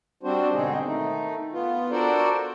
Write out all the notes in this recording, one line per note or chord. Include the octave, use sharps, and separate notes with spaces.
G3 C4 D4 F#4 C5
G#2 B2 D3 C4 D#4 G#4
D#3 A3 D#4
B3 F4
D4 F#4 A4 A#4 C5 D5